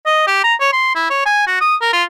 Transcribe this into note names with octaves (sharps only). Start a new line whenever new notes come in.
D#5
G4
A#5
C#5
C6
E4
C#5
G#5
F#4
D#6
A#4
F4